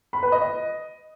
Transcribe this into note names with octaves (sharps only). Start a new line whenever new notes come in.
B5
B4
D#5